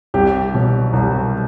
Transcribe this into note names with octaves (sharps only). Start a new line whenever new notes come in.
C2 G4
B2 F#3
C2